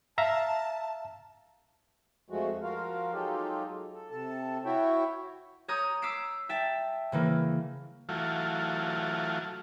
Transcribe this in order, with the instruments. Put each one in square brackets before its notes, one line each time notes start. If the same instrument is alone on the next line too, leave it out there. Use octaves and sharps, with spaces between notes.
[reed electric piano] E5 F5 A#5 [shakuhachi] A5
[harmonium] F2 F3 G#3 A3 F#4
F3 F4 F#4 A#4 F5
F#3 G#3 D#4 F4 G4 A4
A4
C3 A4 A5
E4 F#4 C#5 E5 G5
[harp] C#5 A#5 D#6 G6
D6 E6 B6 C7 D7
E5 G5 A5
C#3 E3 A#3
[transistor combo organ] E3 F#3 A3 F4